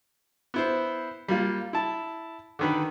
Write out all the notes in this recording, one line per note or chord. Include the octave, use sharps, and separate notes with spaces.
B3 E4 C5
G3 A#3 F4
E4 A5
D3 D#3 B4